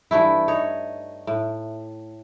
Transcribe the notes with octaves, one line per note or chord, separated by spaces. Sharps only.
G2 E3 A3 E4
D#4 C#5
A2